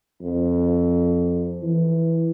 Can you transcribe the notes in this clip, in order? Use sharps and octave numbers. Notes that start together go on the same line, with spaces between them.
F2
E3